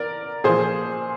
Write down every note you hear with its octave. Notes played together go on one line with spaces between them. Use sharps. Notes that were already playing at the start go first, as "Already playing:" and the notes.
Already playing: A#4 D5
A#2 F3 G#4 C5